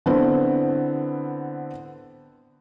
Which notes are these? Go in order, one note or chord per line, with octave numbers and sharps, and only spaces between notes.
D3 B3 C4 E4